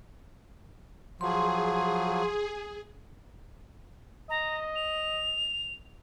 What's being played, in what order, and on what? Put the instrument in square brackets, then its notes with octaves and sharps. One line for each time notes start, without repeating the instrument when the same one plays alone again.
[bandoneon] F3 F#3 [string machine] G#4 [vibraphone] C6
[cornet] D#5 [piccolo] A#5
[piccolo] F7